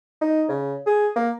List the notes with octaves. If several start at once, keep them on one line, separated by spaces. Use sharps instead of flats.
D#4
C#3
G#4
A#3